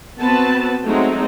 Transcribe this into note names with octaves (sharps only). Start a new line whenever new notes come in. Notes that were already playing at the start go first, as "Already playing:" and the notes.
B3 C4 F#4 B4 A5
F#3 G#3 A3 C4 D#4